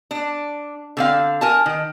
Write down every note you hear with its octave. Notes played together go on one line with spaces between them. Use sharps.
D4
D3 C4 F5
A#4 G#5 A5
D#3